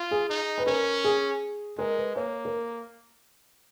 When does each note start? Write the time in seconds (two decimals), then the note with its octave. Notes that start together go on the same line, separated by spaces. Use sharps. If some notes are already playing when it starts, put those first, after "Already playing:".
Already playing: F4
0.11 G#4
0.29 D#4
0.58 B4
0.66 C#4 A#4
1.04 G#4
1.78 G#3 A#4
1.97 B4
2.15 A#3 C#5
2.45 A#4